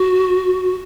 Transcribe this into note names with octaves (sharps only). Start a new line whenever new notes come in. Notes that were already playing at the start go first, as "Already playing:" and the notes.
Already playing: F#4